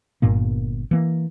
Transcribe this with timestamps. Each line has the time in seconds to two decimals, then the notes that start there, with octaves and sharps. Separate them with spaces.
0.22 G1 G2 A#2 A#3
0.91 E3 A#3